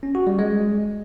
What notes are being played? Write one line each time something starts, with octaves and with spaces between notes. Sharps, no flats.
C#4
F#4
G3
G#3